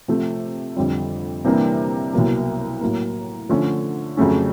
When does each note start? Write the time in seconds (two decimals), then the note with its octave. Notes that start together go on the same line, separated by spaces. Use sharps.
0.08 C3 F3 A3
0.77 F2 D3 G3
1.45 C3 E3 G3 A#3 D4
2.13 C2 B2 F#3 A#3
2.81 A2 F#3 A#3
3.49 D3 F3 A3 C#4
4.17 F2 C#3 F#3 A3 C#4